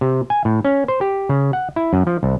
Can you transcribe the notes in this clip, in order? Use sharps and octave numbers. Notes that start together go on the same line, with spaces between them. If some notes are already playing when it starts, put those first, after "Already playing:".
C3
G#5
A2
C#4
C5
G4
C#3
F#5
E4
F#2
F3
C2